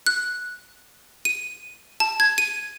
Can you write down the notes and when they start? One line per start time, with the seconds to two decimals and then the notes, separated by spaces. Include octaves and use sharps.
0.07 F#6
1.25 D#7
2.00 A5
2.20 G#6
2.38 D#7